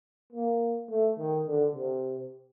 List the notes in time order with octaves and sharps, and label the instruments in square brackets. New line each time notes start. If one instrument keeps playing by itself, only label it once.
[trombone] A#3
A3
D#3
D3
C3